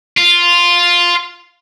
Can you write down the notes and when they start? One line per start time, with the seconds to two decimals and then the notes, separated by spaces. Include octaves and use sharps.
0.18 F4